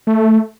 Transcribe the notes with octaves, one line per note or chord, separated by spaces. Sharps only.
A3